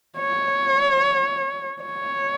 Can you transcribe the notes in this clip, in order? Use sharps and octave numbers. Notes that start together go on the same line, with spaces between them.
C#5
C#5